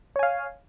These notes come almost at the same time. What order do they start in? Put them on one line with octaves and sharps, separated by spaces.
C#5 G#5 F5